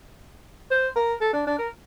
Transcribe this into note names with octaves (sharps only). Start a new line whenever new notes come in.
C5
A#4
A4
D4
D4
A#4